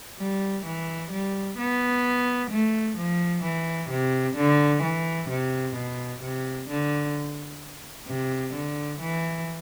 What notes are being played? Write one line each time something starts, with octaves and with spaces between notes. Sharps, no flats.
G3
E3
G3
B3
A3
F3
E3
C3
D3
E3
C3
B2
C3
D3
C3
D3
E3